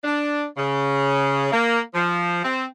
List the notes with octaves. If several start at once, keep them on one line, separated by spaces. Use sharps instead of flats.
D4
C#3
A#3
F3
C4